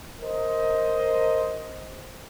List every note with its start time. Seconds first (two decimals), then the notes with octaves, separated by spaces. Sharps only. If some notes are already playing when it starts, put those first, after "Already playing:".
0.21 A#4 C5 D#5